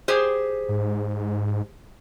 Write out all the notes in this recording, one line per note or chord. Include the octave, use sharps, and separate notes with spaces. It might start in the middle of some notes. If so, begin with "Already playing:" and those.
G4 G#4 C5
G#2